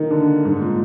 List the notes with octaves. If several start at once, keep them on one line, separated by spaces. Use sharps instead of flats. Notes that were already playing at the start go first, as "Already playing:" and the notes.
Already playing: D#3 A#3
D3
G#2
A#2